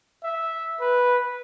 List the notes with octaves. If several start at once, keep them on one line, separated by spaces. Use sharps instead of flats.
E5
B4